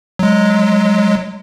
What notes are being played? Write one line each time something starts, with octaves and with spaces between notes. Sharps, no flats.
F#3 G#3